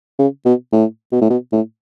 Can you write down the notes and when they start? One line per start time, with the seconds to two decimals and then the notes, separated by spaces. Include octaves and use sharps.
0.19 C#3
0.45 B2
0.72 A2
1.12 B2
1.21 A2
1.30 B2
1.52 A2